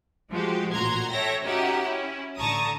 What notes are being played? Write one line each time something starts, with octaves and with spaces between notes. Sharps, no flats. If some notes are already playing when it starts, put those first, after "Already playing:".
F3 G#3 F#4 G4
A1 A#2 F#4 A#5 C6 G#6
A4 C#5 E5 G5 A#6
C#4 D#4 F#4 G4 E5 F#5
C#4 E4
A1 D3 A5 A#5 C#6 D#6